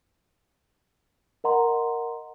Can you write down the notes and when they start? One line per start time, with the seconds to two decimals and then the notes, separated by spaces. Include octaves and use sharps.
1.44 A#4 D#5 F#5 A#5 C6